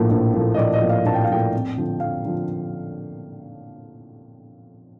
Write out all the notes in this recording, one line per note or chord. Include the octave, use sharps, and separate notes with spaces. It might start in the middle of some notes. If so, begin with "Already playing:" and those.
Already playing: A#1 A2 F3 A#3
A#1
A2 F3 A#3
D#5
A#1 D5
D#5
A2 F3 A#3
F5
A#1 A5
G5
F5
A2 F3 A#3 G5
F2
D3 F3
F2 F5
D3 F3